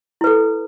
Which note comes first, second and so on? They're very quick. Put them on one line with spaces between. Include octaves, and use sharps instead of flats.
E4 B4 A4